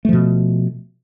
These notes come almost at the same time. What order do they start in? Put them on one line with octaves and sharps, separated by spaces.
A3 F3 B2